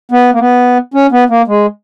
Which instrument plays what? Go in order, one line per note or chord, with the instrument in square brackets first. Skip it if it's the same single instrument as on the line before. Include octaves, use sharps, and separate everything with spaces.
[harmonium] B3
A#3
B3
C#4
B3
A#3
G#3